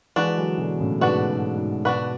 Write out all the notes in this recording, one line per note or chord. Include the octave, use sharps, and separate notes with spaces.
E3 G#3 D4 F#4 B4
D3 F#3
B2 D3
A2 C#3
G#2 B2 D4 F#4 B4
G#2
G#2
G#2 B2 D4 F#4 B4